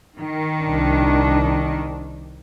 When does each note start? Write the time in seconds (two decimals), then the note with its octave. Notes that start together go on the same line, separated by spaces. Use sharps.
0.18 D#3
0.64 C2 D4